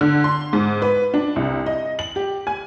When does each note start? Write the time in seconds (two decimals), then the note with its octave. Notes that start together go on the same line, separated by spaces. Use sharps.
0.01 D3
0.24 C6
0.53 G#2
0.82 B4
1.14 D4
1.36 C2
1.66 D#5
1.99 F#7
2.16 G4
2.47 G#5